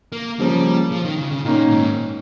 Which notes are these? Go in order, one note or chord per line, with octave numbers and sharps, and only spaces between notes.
A#3
C#3 F3 G3 A#3 C#4
F3
D#3
C#3
C#3
A#2 D#3 A#3 C#4
G#2